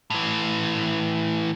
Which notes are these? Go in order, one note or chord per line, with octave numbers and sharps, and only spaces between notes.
A2 E3